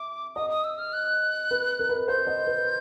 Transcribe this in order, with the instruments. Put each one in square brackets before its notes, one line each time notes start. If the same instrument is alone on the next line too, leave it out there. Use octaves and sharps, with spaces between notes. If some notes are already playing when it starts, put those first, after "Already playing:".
Already playing: [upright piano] E5 [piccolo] D6
[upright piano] D#5 [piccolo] D#6
[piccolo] D#6
E6
F6
F#6
[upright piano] B4
A#4
B4
[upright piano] C5 [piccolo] G6
[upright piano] D#5
B4